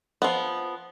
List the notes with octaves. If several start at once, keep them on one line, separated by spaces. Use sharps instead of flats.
F3 B3